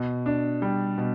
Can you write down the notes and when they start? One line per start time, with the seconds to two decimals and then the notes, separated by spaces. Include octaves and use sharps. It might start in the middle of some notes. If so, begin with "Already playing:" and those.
Already playing: B2
0.26 D4
0.62 G3
0.98 B2